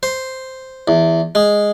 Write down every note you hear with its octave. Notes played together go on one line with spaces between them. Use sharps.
C5
E2
G#3